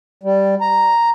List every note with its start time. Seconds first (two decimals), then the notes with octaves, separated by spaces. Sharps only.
0.23 G3
0.61 A#5